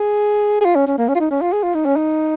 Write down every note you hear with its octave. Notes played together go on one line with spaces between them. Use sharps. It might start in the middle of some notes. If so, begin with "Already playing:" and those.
Already playing: G#4
G#4
F4
C#4
C#4
A#3
C#4
F4
D#4
C#4
F4
G#4
F4
D#4
C#4
D#4